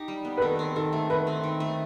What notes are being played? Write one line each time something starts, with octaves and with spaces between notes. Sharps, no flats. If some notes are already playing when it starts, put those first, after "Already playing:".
Already playing: D#4 G4
G3
B3
B4
D#3 A4
C4
D#3 A4
A3
D#3 B4
C4
D#3
A3